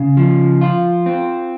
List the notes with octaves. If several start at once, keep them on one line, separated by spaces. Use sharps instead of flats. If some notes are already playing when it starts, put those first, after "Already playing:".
Already playing: C#3
F3
F4
C4